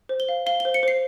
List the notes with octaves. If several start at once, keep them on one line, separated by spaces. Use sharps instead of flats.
C5
G7
F5
F5 G7
G7
C5
C#7
C5 C7